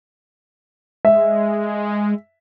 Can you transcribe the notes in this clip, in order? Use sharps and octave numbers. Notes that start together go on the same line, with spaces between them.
G#3 E5